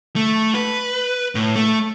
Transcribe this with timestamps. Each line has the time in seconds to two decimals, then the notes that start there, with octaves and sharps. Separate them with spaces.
0.16 A3
0.55 B4
1.35 A2
1.56 A3